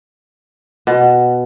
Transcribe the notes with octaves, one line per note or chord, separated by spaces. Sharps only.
B2